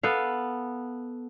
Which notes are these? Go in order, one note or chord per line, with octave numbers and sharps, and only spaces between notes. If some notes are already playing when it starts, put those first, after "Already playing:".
B3 A4 F5